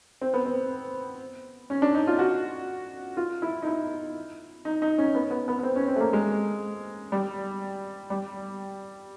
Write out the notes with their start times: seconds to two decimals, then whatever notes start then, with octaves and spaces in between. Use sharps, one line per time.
0.21 C4
0.34 B3
0.46 C4
1.70 C#4
1.82 D4
1.95 D#4
2.07 F4
2.19 F#4
3.17 F4
3.42 E4
3.62 D#4
3.67 E4
4.65 D#4
4.82 D#4
4.98 C#4
5.15 B3
5.31 B3
5.48 B3
5.59 B3
5.63 C4
5.76 C#4
5.88 C4
5.96 A3
6.00 A#3
6.13 G#3
7.12 G3
8.10 G3